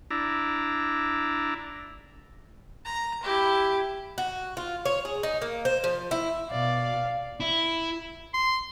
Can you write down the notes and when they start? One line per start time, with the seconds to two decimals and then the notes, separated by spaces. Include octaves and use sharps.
0.10 D4 E4 A#5
2.85 A#5
3.23 E4 G4
4.18 F#4
4.57 F4
4.85 C#5
5.05 G#4
5.23 D#4
5.42 A#3
5.65 C5
5.84 F3
6.11 E4
6.51 B2 D5 F5
7.40 E4
8.34 C6